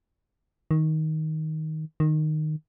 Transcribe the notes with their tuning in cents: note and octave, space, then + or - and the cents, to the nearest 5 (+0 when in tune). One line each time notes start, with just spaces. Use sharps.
D#3 +10
D#3 -15